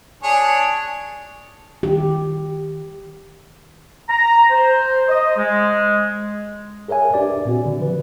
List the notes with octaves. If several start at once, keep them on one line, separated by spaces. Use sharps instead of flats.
D4 G#4 C#5
D#3 G4
A#5
C5
D#5
G#3
G#4 A#4 C#5 E5 G#5
D4 G4 B4 D5
A#2 C4 F#4
D3
F3 B4